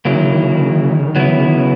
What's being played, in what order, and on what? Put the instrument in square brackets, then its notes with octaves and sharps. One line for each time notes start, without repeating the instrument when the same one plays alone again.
[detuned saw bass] C#3 [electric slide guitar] F#3 A#3 E4
[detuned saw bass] D#3
C#3
D#3
C#3
D#3
C#3
D#3
C#3
D#3
C#3
D#3
[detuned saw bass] C#3 [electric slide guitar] F#3 B3 E4
[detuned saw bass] D#3
C#3
D#3
C#3